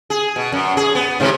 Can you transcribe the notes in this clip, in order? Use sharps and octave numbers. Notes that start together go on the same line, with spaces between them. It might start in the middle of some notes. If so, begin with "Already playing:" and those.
G#4
B2
F#2
G#4
B3
G#2 C3 E3